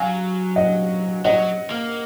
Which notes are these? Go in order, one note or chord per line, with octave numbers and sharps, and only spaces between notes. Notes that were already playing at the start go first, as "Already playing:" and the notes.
Already playing: F#3 F5 G#5
D#5 F#5
F#3 D#5 F#5
A#3